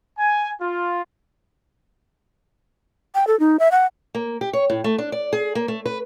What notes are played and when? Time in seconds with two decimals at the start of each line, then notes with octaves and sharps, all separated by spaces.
0.19 G#5
0.61 F4
3.15 G5
3.27 A4
3.40 D#4
3.59 E5
3.72 F#5
4.15 A#3
4.41 G4
4.53 C#5
4.70 A2
4.84 A3
4.98 D4
5.12 D5
5.33 G#4
5.55 A#3
5.68 A3
5.86 B4